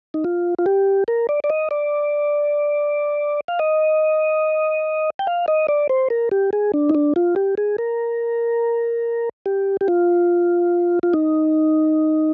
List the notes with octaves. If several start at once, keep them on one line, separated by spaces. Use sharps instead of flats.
D#4
F4
F4
G4
A#4
D5
D5
D#5
D5
F5
D#5
G5
F5
D#5
D5
C5
A#4
G4
G#4
D4
D#4
D4
F4
G4
G#4
A#4
G4
G4
F4
F4
D#4